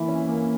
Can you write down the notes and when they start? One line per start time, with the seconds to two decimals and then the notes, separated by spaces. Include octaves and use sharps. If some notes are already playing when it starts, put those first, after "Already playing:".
Already playing: E3 A#3 E4
0.08 C#4
0.29 A#3